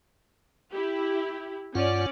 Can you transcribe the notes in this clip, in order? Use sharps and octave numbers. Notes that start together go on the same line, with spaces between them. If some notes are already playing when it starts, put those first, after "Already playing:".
E4 G4
G2 C#4 F4 D5 F#5